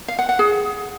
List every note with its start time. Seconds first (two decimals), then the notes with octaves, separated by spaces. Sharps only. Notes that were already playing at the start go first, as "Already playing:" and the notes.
0.08 F5
0.19 F#5
0.29 F#5
0.39 G#4